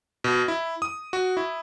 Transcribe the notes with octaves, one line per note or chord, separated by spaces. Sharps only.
B2
E4
D#6
F#4
E4